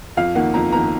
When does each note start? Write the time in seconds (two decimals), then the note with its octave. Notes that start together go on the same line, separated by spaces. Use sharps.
0.17 F2 F5
0.35 D#3 A#3 F#5
0.54 F2 A#5
0.72 D#3 A#3 A#5